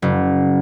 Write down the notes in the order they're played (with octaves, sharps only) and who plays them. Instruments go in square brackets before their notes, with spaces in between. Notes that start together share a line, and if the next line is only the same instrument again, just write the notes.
[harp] F#1